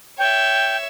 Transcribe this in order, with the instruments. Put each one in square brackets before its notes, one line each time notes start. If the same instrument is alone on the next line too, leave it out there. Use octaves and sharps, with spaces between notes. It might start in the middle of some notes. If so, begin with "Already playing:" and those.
[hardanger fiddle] C#5 E5 [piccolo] G5